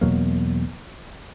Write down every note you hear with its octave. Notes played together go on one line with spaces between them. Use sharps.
E2 B2 F#3 A#3